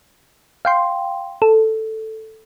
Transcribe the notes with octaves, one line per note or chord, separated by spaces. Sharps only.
F5 G5 C6
A4